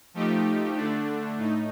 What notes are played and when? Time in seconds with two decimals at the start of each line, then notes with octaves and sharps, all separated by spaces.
0.14 F3 A3 D#4 G4
0.75 D3 A3 D4
1.37 A2 A3 D#4